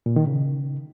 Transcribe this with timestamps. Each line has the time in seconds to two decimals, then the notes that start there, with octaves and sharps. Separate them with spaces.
0.06 A#2
0.16 D#3
0.27 C#3